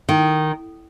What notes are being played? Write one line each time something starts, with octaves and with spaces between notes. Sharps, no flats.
D#3